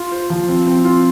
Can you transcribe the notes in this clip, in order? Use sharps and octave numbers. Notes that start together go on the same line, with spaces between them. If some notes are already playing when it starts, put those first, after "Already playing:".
Already playing: F4
C5
F3
C4
C4
F4